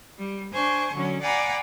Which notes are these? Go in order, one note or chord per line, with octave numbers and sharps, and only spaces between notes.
G3
D4 C5 G#5 C#6
D3 F#3 C#4
D5 F5 F#5 G#5 A#5 B5